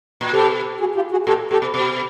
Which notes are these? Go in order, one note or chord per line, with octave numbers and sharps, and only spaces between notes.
A#2
B2 G4 A4
F#4 G#4
F4 G4
F#4 G#4
A#2 G4 A4
A#2 G4 A4
B2
B2